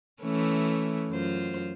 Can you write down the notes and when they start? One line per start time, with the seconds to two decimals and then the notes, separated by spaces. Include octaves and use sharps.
0.22 E3 A3 C#4
1.10 F#2 F4 C5